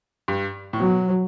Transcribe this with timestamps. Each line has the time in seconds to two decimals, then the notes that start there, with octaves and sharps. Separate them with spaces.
0.28 G2
0.73 A2
0.80 B2 F#3